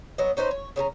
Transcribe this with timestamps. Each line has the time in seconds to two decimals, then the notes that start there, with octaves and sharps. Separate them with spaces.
0.18 F#3 B3 C#5 D#5
0.37 C#4 D#4 B4 C5
0.51 C#5
0.76 C#3 C#4 A4 A#5